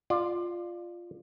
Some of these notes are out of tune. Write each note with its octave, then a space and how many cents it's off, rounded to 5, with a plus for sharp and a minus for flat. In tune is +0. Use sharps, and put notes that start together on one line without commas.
F4 +0 D5 +25